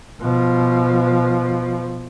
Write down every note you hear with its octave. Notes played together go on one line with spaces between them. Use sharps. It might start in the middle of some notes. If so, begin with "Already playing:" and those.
B2 F3